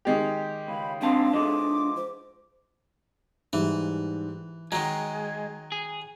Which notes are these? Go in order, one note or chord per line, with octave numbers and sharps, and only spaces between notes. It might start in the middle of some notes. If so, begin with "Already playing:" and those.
D#3 G#3 G4
C#2 B5
G#2 C4 D4 F5 A5
F3 G#3 A4 D#5 D6
C5
G#2 E3 G3
D#3 F#3 G#3 A#5
G#4